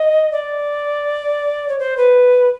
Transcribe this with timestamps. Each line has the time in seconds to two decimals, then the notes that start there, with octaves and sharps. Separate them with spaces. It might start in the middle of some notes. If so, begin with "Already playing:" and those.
Already playing: D#5
0.32 D5
1.68 C#5
1.79 C5
1.97 B4